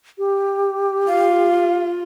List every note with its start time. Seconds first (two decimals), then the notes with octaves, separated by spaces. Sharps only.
0.18 G4
1.07 F4 F5